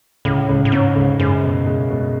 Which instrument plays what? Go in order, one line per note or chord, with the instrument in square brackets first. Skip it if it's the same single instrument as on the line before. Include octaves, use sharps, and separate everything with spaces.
[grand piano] C#2 [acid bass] A2
[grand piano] C#2
[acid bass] A2
[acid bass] G#2 [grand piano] C#4
[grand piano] C#2
[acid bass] F#2 [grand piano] G#3
[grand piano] B2
G#3
B2